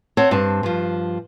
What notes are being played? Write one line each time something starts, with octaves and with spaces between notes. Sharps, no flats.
C4 C#5 F#5 A5
G2 C4 A5
G2 F3